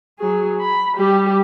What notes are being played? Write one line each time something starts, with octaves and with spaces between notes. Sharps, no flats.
F#3 G#4
B5
G3 G4